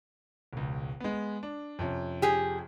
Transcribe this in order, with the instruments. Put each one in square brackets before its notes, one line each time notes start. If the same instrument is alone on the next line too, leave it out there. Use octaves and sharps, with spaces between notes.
[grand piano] E1 C#2
G#3 B3
D4
F2 C3 C#4
[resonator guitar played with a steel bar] G4 G#4